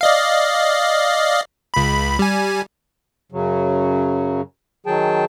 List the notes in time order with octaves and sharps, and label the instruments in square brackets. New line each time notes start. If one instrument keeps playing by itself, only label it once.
[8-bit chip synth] D5 D#5 F5
C#2 B5
G3 G#5
[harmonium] F#2 C#3 F#3
D#3 F#3 G#4 G5 A5